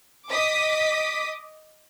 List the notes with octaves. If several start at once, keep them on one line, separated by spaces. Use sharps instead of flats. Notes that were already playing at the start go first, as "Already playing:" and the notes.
D#5 D6 D#6 B6